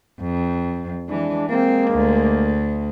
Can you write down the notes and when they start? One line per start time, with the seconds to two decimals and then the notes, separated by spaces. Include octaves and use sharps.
0.20 F2
1.09 E3 G#3 D4
1.49 G#3 A#3 C4
1.91 D2